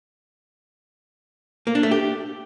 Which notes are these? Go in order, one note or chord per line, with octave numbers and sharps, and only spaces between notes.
A#3
D4
A3
G4